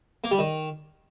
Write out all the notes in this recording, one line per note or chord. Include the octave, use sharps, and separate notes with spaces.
A#3
G3
D#3